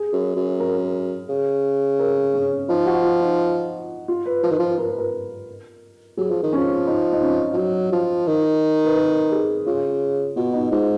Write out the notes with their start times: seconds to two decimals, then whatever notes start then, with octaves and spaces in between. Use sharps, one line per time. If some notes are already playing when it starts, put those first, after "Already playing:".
Already playing: G#4
0.13 F#2
0.36 F#2
0.60 A#4
1.29 C#3
1.99 A#4
2.34 C#4
2.69 F3 D#4
2.86 F#4
3.04 F4
3.21 D#4
4.08 F4
4.26 B4
4.43 F3 B4
4.51 D#3
4.59 F3 B4
4.78 A#4
4.88 B4
4.98 A#4
6.17 F#3 G#4
6.30 F3
6.43 D#3
6.53 F3 C#4
6.87 D#4
7.13 D#4
7.22 C#4
7.53 F3
7.57 F#3
7.92 F3
8.27 D#3
8.85 B4
8.97 A#4
9.32 G#4
9.67 C#3 F4
10.36 B2 F4
10.53 D#4
10.71 G#2 F4